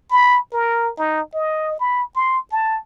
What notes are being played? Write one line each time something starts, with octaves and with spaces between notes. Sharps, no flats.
B5
A#4
D#4
D#5
B5
C6
A5